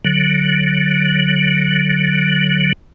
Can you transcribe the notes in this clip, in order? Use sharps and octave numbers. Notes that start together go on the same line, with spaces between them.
D3 F#3